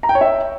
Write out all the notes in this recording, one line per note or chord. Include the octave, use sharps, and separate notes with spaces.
A#5
G5
C#5
E5